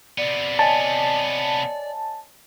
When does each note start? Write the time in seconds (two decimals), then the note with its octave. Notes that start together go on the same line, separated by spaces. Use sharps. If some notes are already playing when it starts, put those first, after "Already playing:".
0.18 C3 B3 D5
0.59 C#5 D#5 G#5 A5